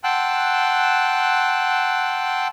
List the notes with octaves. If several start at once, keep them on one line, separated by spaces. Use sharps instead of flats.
F#5 G5 A5 C6 E6 F#6